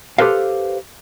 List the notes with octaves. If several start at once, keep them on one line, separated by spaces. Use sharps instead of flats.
G4 A4 B4 C5 F5